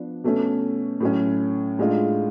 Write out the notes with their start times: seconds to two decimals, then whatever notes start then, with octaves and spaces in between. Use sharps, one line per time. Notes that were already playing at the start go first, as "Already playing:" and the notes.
Already playing: F3 B3 D4
0.24 B2 A3 C#4
1.00 A2 F#3 C#4
1.79 A2 G#3 D4 F4